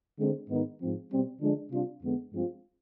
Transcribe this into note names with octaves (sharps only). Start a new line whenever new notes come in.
D3 G#3 C4
G#2 D#3 B3 D#4
G#2 F3 C4
B2 G3 C4
D3 F3 G#3 D4
C3 G3 D4 F4
F2 D3 G#3 B3
G2 F3 G#3 C4 F4